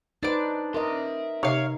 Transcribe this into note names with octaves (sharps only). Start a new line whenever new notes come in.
D4 D#4 B4 C5 D6
A#4 D#5 E5 C6
C3 D#4 C#5 F5